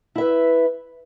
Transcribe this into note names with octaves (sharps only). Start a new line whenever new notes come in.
E4 B4 E5